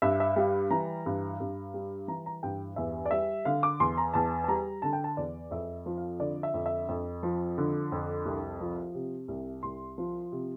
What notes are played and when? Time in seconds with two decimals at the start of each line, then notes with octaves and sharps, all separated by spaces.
0.02 G2 E5
0.20 E5
0.36 G3 F5
0.71 E3 A#5
1.06 G2
1.40 G2
1.74 G3
2.08 E3 A#5
2.26 A#5
2.43 G2 G5
2.76 E2 E5
3.06 D5
3.11 G3 E5
3.45 D3 F5
3.63 D6
3.80 E2 C6
3.98 A#5
4.14 E2 A5
4.44 A5
4.48 G3 A#5
4.82 D3 A5
4.93 G5
5.04 A5
5.17 E2 D5
5.51 F2 E5
5.86 F3
5.98 F5
6.20 D3 D5
6.43 E5
6.54 F2
6.66 E5
6.89 F2
7.23 F3
7.58 D3
7.92 F2
8.25 C2
8.61 F3
8.95 C3
9.28 C2
9.63 C2 C6
9.98 F3
10.32 C3